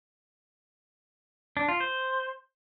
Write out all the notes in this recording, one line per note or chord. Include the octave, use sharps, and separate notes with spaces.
D4
F4
C5